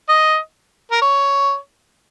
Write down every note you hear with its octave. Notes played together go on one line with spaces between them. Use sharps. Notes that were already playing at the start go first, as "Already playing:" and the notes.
D#5
A#4
C#5